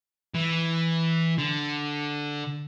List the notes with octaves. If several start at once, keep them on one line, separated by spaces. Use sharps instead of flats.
E3
D3